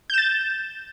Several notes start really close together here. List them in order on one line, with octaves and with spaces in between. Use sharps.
G6 E7 A6